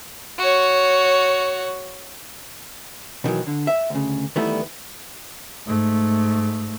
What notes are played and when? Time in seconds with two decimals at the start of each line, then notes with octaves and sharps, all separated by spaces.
0.39 F#4 C#5
3.24 B2 D#3 E3 F#3
3.47 D3
3.67 E5
3.90 D2 C#3
4.36 D#3 E3 G3 A3 B3 E4
5.66 G#2 A3